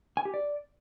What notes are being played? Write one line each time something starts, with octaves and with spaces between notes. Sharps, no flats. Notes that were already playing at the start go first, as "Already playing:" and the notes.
G#5
G4
D5